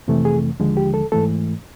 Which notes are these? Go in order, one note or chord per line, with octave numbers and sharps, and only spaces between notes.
F2 C3 E3 A3
G#4
D#2 D3 F3 G#3
G4
A4
G#2 E3 A3 A4